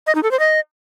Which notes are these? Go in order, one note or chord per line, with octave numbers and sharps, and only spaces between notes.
D#5
D#4
A4
C5
D#5